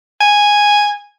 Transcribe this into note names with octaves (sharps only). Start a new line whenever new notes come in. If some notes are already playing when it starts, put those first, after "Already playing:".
G#5